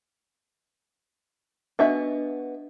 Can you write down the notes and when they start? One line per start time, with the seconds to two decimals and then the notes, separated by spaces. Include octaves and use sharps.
1.79 B3 D4 F#4 D#5 E5